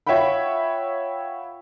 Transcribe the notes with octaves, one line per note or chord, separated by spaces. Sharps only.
F4 C#5 E5 F#5 G5 B5